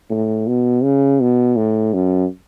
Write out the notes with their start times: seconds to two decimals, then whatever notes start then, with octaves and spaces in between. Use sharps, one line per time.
0.10 A2
0.47 B2
0.84 C#3
1.21 B2
1.56 A2
1.94 F#2